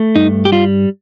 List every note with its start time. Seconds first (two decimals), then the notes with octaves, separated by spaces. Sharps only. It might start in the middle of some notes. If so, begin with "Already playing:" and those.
Already playing: A3
0.16 G2 D#4
0.45 G4
0.52 G3 F4